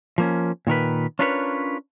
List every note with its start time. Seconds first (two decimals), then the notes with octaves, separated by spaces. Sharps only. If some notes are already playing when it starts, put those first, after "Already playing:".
0.18 F3 A#3 C#4
0.67 A#2 D#3 A#4 B4
1.19 C#4 D4 F4 A#4 B4 C#5